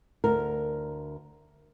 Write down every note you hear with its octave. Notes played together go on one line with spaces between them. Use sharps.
D2 A#4